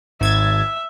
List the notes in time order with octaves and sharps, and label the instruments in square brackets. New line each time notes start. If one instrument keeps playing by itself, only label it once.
[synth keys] G#1 G#6 A6 [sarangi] E5